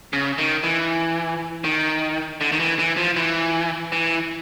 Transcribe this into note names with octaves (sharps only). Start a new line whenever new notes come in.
C#3
D#3
E3
D#3
D3
D#3
E3
E3
F3
E3
E3